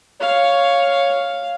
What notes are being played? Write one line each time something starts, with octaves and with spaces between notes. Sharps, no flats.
C#5 F5